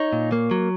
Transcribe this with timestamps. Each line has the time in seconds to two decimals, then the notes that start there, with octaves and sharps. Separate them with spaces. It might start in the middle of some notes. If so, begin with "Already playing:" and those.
Already playing: D#4 C#5
0.13 A#2
0.32 A#3
0.51 F#3